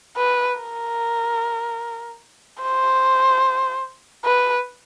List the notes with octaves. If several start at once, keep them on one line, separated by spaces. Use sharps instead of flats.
B4
A#4
C5
B4